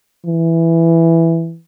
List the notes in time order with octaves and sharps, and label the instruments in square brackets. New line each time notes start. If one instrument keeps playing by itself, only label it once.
[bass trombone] E3